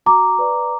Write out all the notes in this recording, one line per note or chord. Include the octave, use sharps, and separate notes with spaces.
F#4 A#5 D6
B4 D5